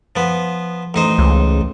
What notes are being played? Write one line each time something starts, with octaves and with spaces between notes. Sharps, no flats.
F3 B3
A1 D#4 C5
C#2